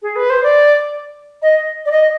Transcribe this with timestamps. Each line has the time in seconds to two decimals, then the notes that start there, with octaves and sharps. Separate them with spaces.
0.02 G#4
0.16 B4
0.30 C5
0.43 D5
1.42 D#5
1.86 D5
1.91 D#5